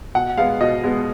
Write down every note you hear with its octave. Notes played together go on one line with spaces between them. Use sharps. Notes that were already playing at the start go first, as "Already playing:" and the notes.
B2 F#5
G#3 B3 F5
B2 D#5
G#3 B3